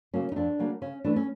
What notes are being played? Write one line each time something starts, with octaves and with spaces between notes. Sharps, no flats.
C#3 F#3 A#3 C#4
D#4
F2 D4
C#3 F#3 A#3
C#3 C#4
E3 A3 D4
C#4